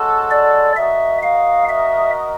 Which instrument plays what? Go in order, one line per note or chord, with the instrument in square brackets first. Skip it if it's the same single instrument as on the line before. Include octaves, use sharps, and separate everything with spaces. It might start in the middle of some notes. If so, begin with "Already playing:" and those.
Already playing: [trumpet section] G#3 C#4 F#4 A4
[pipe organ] D5
[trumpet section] F#4 A#4 D#5 [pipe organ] E5
[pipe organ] F5
E5